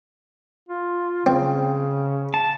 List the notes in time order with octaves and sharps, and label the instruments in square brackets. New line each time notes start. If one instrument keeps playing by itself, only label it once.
[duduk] F4
[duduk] C#3 [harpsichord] C4
[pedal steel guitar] A5